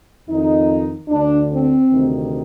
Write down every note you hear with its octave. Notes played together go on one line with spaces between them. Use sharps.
F2 D#3 D#4
D2 D3 D4
C4
D2 C3 D#3